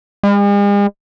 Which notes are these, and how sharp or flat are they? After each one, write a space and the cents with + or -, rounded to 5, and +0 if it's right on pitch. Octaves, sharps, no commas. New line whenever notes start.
G#3 -45